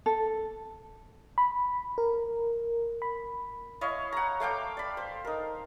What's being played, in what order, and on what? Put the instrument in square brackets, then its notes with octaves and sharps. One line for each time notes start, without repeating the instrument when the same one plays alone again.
[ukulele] A4
[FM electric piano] B5
A#4
B5
[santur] E4 C#5 D#5 F5
F#5 A#5
A3 F5 G5 D6
D5 B5
C5
D#4 A#4